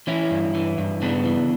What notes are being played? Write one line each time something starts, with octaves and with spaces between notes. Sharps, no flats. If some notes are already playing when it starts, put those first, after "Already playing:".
E3 C#4 E4
G2
E3
G2
C#3 B3 D4
E3